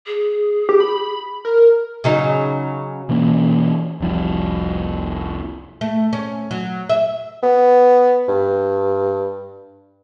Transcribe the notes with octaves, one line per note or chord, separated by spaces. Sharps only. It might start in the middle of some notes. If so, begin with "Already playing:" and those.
G#4
G4
B5
A#4
C#3 F#3 D#4
B2 E3 A#3 C#4
F1 C2 F3 G3
A3
C#4
F#3
E5
B3
G2